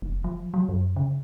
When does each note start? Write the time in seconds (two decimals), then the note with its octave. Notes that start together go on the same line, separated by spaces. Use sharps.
0.02 F1
0.24 F3
0.54 F#3
0.69 F#2
0.96 C#3